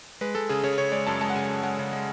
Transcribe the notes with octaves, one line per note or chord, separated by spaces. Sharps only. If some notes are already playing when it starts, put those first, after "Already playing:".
G#3 B4
G#3 A4
C#3 G#4
C#3 C#5
C#3 C#5
G#3 D5
F#2 A5
G#3 A5
F#5
C#3 G#5
F#2
G#3 F#5
C#3
G#3